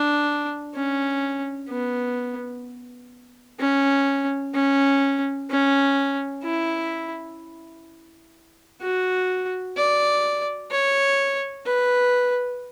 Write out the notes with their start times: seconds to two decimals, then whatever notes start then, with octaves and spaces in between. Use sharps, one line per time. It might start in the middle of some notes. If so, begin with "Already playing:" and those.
Already playing: D4
0.75 C#4
1.69 B3
3.60 C#4
4.55 C#4
5.50 C#4
6.44 E4
8.82 F#4
9.77 D5
10.71 C#5
11.67 B4